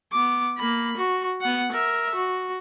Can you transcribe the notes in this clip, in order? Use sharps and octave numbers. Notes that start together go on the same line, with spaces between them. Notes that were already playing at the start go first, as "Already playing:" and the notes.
B3 D6
A#3 B5
F#4
B3 F#5
A#4 E5
F#4